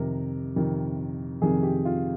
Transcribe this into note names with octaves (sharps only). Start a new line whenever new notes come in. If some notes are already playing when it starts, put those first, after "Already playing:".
Already playing: F2 C3 D#3 A#4
F2 C3 D#3
F2 C3 D#3 G#4
G4
F4